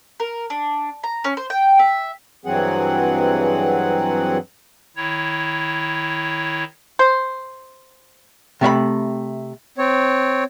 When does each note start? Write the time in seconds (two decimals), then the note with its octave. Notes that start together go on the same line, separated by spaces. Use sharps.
0.20 A#4
0.50 D4
1.04 A#5
1.24 C#4
1.37 C5
1.50 G5
1.79 E5
2.45 G2 E3 F#3 C4 G#4 F#5
4.96 D#3 E4 C#5
6.99 C5
8.61 C3 A3 E5 B5
9.78 C4 C#5